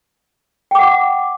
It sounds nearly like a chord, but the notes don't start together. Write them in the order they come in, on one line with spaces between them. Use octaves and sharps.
G5 D6 F#5